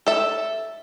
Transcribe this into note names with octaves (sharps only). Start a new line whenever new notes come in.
A4 E5